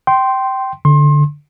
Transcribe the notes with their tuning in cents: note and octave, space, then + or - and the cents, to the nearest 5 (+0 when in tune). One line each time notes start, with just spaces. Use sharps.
G5 -15 C6 +0
D3 -10 C6 +30